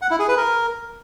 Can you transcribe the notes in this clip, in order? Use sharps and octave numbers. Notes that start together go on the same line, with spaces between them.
F#5
E4
G#4
B4
A#4